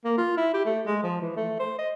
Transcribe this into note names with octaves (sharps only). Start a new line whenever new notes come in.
A#3
F4
E4
G4
A3
G#3
F3
E3
A3
C5
D#5